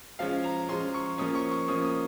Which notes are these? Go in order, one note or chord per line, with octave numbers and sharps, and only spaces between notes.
F3 G#3 C#4 F5
A#5
F3 G#3 C#4 C6
C#6
F3 A#3 C#4 D#6
C#6
C#6
F3 A#3 C#4 D#6
D#6